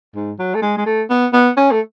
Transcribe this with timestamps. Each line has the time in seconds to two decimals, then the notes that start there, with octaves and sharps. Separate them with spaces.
0.15 G#2
0.39 F#3
0.55 A3
0.62 G#3
0.77 G#3
0.86 A3
1.10 B3
1.33 B3
1.57 C#4
1.71 A3